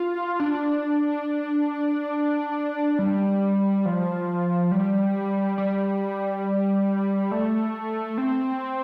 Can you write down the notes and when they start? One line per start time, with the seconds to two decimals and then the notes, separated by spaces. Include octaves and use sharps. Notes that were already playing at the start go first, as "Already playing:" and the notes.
Already playing: F4
0.40 D4
2.99 G3
3.85 F3
4.71 G3
5.58 G3
7.31 A3
8.18 C4